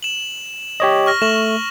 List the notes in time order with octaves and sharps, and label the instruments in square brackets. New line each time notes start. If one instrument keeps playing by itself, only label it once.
[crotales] E7 F#7
[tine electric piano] G4 C#5 D#5
[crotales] C#6 F6 A#6
[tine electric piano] A3 [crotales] E7 F#7